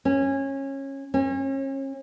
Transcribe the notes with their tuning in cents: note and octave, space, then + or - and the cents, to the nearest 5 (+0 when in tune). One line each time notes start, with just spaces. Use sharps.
C#4 -20
C#4 -35